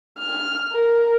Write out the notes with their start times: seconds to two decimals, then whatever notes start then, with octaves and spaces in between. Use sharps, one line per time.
0.18 F6
0.73 A#4